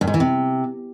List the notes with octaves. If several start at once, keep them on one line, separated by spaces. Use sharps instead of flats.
G2
G#2
E3
C3